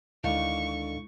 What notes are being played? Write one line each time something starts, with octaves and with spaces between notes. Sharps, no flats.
D2 D3 D#3 G#3 E4 F5 C#6